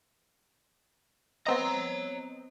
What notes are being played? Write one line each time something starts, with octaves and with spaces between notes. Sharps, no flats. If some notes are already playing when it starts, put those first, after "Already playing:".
B3 C4 C#5 D#5 A#5